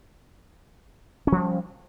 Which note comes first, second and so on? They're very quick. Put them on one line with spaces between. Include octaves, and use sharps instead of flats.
C#4 F3 G3